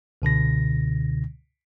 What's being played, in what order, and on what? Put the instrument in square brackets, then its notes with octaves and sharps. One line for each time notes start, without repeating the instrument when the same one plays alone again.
[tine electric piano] C#2 B2 D3 A#6